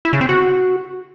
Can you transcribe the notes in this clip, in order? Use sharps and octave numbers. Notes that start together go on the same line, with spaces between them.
E4
C#3
C4
F#4